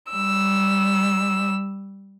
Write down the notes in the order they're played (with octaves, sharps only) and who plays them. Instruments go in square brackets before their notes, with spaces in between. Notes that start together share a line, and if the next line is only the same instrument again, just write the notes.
[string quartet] G3 E6